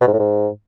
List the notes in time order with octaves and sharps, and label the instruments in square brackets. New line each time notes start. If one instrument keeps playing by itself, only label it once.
[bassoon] B2
G#2
A2
G#2